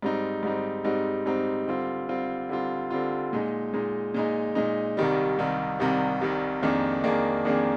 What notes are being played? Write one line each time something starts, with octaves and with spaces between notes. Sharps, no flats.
G#2 G3 C4 D#4
G#2 G3 C4 D#4
G#2 G3 C4 D#4
G#2 G3 C4 D#4
D3 G3 C4 F4
D3 G3 C4 F4
D3 G3 C4 F4
D3 G3 C4 F4
A#2 G#3 D#4
A#2 G#3 D#4
A#2 G#3 D#4
A#2 G#3 D#4
C2 C3 D#3 G3
C2 C3 D#3 G3
C2 C3 D#3 G3
C2 C3 D#3 G3
F2 D#3 A#3 D4 G#4
F2 D#3 A#3 D4 G#4
F2 D#3 A#3 D4 G#4